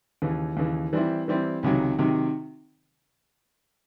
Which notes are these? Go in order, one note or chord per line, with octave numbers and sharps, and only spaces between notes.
D#2 C#3 E3
D#2 C#3 E3
E3 G3 C4 E4
E3 G3 C4 E4
C#2 C3 D#3 F#3
C3 D#3 F#3